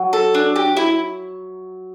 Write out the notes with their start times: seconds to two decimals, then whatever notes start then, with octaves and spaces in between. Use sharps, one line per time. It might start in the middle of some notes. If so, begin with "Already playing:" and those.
Already playing: F#3
0.13 A4
0.35 D4
0.56 G4
0.77 E4